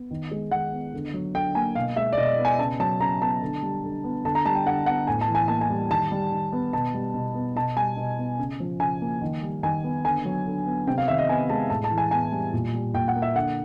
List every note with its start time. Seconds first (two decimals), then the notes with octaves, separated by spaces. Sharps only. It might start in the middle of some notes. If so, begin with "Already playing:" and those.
Already playing: B3
0.11 D#3
0.31 G#3
0.51 D#3 F#5
0.72 B3
0.93 D3
1.14 F#3
1.35 D3 G5
1.55 A#3 G#5
1.75 B2 F5
1.96 G#3 E5
2.13 D5
2.18 B2 D#5
2.38 B3
2.45 G#5
2.59 C#3 A5
2.79 F#3 A5
3.00 C#3 A#5
3.21 B3 A5
3.42 D3
3.63 G3
3.83 D3
4.04 B3
4.25 D3 A5
4.35 A#5
4.46 G3 A5
4.55 G5
4.66 D3 F#5
4.86 B3 F#5
5.07 A2 G#5
5.21 A5
5.28 E3
5.35 G#5
5.48 A#3 A5
5.61 G#5
5.70 G3
5.90 D#3 A5
6.11 G3
6.32 D#3
6.52 B3
6.73 B2 A5
6.94 G3
7.14 B2
7.35 B3
7.55 B2 A5
7.77 G3 G#5
7.97 B2
8.18 B3
8.39 C#3
8.60 F3
8.80 C#3 G#5
9.01 A#3
9.21 D#3
9.42 G3
9.63 D#3 G#5
9.84 B3
10.05 D3 G#5
10.25 F#3
10.46 D3
10.66 B3
10.87 C3 G5
10.98 F5
11.08 D#3 E5
11.18 D#5
11.29 B3 G#5
11.49 G#3 A5
11.70 A2 A5
11.84 A5
11.91 E3
11.98 G#5
12.11 B3 G#5
12.32 G3
12.53 A#2
12.74 G3
12.94 A#2 G5
13.08 F#5
13.15 A#3
13.22 E5
13.36 D3 F#5